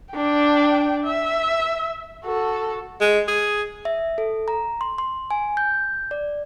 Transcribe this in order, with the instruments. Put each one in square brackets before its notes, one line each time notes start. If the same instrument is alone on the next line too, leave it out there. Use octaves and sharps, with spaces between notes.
[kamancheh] D4 G5
E5
F#4 A4
[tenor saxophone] G#3
G#4
[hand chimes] E5
A4
A#5
C6
C6
G#5
G6
D5